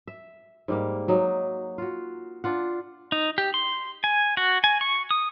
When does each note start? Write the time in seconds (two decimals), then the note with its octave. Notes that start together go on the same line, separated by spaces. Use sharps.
0.08 E5
0.68 G#2 G3 A#3
1.08 F#3 D#4
1.78 F4 F#4
2.44 D4 F4 F#5
3.12 D#4
3.38 G4
3.54 C6
4.04 G#5
4.37 F#4
4.64 G#5
4.81 C#6
5.11 D#6